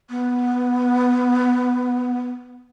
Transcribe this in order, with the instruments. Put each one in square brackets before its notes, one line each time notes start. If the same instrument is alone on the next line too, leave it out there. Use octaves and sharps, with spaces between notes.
[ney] B3